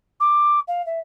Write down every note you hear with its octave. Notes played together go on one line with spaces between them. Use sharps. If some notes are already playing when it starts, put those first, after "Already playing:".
D6
F5
E5